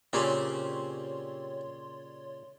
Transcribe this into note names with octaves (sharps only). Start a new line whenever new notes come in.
A#2 C#3 C4 C#4 G4 C#5 D5 C6